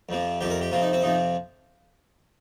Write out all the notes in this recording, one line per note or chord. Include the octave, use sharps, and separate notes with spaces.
F2 C3 F3
F2 C3 F3 G4
A#4
G4
F2 C3 F3 F4
D#4
C4
F2 C3 F3 D#4